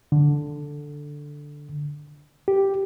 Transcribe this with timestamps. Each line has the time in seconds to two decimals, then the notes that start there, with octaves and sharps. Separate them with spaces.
0.12 D3
2.48 G4